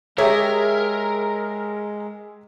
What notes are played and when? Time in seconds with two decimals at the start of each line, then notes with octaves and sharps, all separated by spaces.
0.18 G#3 G4 G#4 A#4 C#5 E5